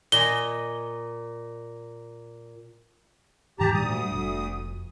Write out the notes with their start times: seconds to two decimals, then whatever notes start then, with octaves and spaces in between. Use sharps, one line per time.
0.12 A#2 D#5 G#5 G7
3.59 D#1 G#2 E3 G4 A5 A#5
3.74 D2 A#2 G3 D#6
4.09 F1